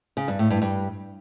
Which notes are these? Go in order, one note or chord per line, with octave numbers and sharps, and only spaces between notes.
C#3
G2
A2
G2
G2